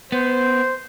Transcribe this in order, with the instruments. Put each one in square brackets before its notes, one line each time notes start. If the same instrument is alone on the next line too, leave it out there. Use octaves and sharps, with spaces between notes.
[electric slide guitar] B3 [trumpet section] C5